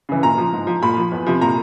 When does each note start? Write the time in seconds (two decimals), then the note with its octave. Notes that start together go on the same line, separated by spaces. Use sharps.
0.09 C#3 E3
0.23 A#2 A#5
0.38 F3
0.53 G#2
0.67 F3
0.82 A#2 B5
0.97 F3
1.12 E2
1.26 C3 F3
1.41 A#2 A#5